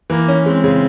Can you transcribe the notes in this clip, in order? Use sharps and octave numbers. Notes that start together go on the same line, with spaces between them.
E3 A#3
C#4
G#3 C4
C#3